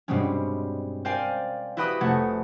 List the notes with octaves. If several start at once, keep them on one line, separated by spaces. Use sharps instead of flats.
G2 B2 G3 G#3 C4 C#4
A#4 C5 D5 F5 G5 G#5
E4 F#4 G4 B4 B5 D#6
F1 A3 F#5 G#6